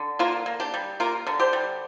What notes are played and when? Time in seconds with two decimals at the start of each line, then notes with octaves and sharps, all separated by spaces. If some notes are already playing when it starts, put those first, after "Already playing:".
Already playing: D3
0.19 A#3 F4 A#4
0.46 A#3
0.60 D4 G4
0.74 G3
1.00 A#3 F4 A#4
1.27 D3
1.40 G4 C5
1.53 G3